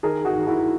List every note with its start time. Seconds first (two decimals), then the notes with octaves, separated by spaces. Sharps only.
0.03 D#3 G#4 A#4
0.25 F#4 G#4
0.36 D#3
0.47 E4 F#4